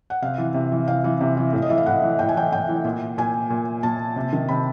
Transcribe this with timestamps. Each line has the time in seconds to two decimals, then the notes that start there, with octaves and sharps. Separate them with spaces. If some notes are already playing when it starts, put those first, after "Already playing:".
0.10 F#5
0.22 C3 F5
0.38 E3
0.54 C3
0.72 E3
0.88 C3 F5
1.04 E3
1.21 C3
1.37 E3
1.53 A2
1.62 D#5
1.70 E3 E5
1.78 F5
1.86 A2 F#5
2.02 E3
2.19 A2 G5
2.29 G#5
2.35 E3 G5
2.52 A2 G5
2.69 E3
2.85 A#2
3.18 A#2 G#5
3.50 A#2
3.83 A#2 A5
4.16 C3
4.33 D#3
4.48 C3 B5